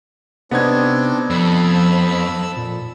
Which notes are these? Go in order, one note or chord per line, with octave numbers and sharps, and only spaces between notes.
C3 B3 C4 D4 D#4 G#6
F2 F3 A4 B5 E6
A#2